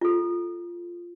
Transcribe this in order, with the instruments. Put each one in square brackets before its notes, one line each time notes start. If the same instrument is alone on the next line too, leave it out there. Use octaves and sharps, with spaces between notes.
[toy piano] F4 A4